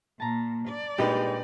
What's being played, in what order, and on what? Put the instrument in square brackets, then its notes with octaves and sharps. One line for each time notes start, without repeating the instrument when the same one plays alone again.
[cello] A#2 [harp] A5 A#5
[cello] D5
[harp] A#2 D4 [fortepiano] G3 G#3 D#4 [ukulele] G4 B4